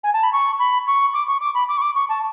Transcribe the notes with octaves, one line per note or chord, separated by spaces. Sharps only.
G#5
A5
B5
C#6
B5
C#6
D6
C#6
D6
B5
D6
C#6
D6
C#6
A5